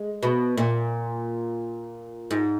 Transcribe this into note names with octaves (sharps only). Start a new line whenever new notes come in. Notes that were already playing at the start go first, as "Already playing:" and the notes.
Already playing: G#3
B2
A#2
G#2